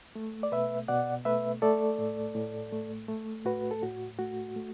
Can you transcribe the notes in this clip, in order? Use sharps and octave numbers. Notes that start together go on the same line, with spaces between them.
A3
D5
B2 B4 E5
B2 D5 F#5
A3 B4 E5
A3 A4 D5
A2
A2
A3
A3
A2 F#4 B4
A4
A2 F#4
A3 F#4
A3